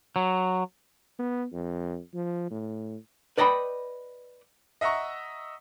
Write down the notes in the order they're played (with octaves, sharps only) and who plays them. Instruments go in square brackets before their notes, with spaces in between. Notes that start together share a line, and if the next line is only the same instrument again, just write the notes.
[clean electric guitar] F#3
[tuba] B3
F2
F3
A2
[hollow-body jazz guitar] B4 D5 D#5 G5 A5 B5
[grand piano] D#5 E5 F#5 A#5 C#6